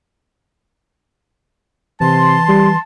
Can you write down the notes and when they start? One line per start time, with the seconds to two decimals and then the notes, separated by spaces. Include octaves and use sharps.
2.01 C3 E3 A5 C6
2.49 G3